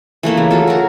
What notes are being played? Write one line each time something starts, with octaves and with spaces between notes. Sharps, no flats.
E3 A3 A#3 E4
C#3
F#3 F4 A4
F#4 A#4